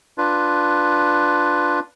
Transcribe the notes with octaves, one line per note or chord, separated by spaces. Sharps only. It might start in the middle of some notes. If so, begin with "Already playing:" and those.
D4 F4 B4